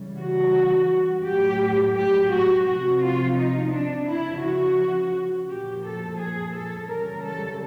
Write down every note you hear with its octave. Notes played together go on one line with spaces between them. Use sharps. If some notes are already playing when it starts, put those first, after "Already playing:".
Already playing: C#3 E3 G3
F#4
A2 F#3 G4
G4
F#4
C3 F3 F#4
F4
D#4
D4
C#3 F3 E4
F#4
A#2 F3 G4
A4
G#4
A4
C#3 E3 G3 A#4
A4